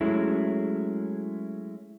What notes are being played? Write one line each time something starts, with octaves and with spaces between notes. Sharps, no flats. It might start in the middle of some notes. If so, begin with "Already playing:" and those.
F#3 G#3 A3 C#4 E4